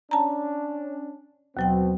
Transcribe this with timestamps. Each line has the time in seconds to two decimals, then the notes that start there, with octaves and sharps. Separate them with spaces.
0.11 C#4 D4 A5 A#5
1.57 D#2 B2 F#3 C4 G5